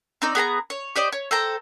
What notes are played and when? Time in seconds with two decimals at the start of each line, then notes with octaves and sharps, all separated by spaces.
0.22 C4 D#4 D5
0.35 B3 G#4 G#5 A#5
0.70 C#5
0.96 G4 C5 D5 D#5
1.12 C#5
1.31 A4 C5 G5 A#5